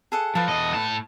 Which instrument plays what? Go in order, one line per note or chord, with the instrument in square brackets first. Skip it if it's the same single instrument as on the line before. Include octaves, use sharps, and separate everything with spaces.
[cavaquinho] G#4 A4 F#5
[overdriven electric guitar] F3 [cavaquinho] A4 B4
[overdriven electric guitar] E2 D#5
A2 A5